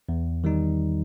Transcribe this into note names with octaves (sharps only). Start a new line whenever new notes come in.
E2
D#3 G3 D#4